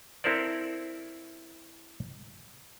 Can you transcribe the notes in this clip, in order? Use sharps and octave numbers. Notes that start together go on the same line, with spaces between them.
C4 E4 A4 A#4 C5 D5